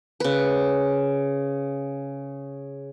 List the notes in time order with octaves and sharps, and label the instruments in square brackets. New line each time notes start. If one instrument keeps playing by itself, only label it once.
[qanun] C#3 B4